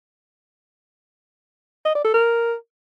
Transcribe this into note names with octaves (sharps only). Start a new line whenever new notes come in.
D#5
D5
A4
A#4